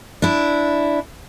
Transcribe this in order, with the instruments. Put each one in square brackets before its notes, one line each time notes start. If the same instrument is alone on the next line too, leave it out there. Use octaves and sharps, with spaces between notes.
[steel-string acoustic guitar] D4 E4